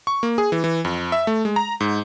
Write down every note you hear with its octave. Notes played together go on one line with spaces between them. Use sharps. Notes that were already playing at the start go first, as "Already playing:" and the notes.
C#6
A#3
G#4
E3
E3
F2
E5
A3
G#3
A#5
G#2